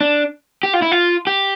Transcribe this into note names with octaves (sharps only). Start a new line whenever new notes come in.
D4
G4
F4
E4
F4
G4